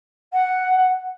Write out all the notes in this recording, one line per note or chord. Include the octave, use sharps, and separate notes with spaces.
F#5